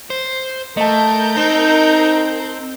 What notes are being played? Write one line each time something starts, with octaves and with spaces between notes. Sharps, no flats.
C5
A3 A#4 D#5 A5 G6
C4 D#4